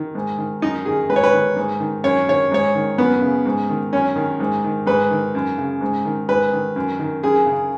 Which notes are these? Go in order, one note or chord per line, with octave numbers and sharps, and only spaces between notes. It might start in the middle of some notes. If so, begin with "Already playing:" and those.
Already playing: D#3
G#2
D#3
F#2 D#4
D#3 G#4
G#2 B4
C#5
B4
D#3
G#2
D#3
F#2 C#5
D#3 C#5
G#2 C#5
D#3
F#2 B3
C#3
G#2
D#3
F#2 C#4
D#3
G#2
D#3
G#2 B4
D#3
F#2
C#3
G#2
D#3
G#2 B4
D#3
F#2
D#3
F#2 G#4
C#3